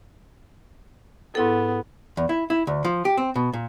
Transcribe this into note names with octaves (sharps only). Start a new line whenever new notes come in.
G#2 B3 E4 A4
E2
E4
E4
D2
F3
G4
C4
B2
A#2